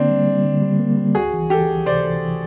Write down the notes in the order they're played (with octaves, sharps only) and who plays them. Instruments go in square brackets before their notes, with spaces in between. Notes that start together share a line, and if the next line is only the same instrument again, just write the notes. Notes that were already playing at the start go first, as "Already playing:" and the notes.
Already playing: [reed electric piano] D3 A#3 [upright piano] C4 D4
[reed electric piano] G3
G3
D3
G3
A#3
G3
[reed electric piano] C#2 [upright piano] F#4 G#4
[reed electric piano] E3
[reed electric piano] E3 [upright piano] G4 A4
[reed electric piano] C#2
[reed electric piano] C3 [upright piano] C5 D5
[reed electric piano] E3
E3